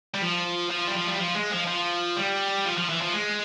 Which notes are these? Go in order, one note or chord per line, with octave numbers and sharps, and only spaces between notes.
G3
F3
F3
G3
F3
G3
F3
G#3
F3
F3
G3
F3
F3
E3
F3
G#3